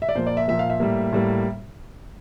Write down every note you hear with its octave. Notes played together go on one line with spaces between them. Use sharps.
E5
D5
A#2 F3 A#3 C5
D5
E5
A#2 F3 A#3 E5
F5
E5
A2 G3 A#3
A2 G3 A#3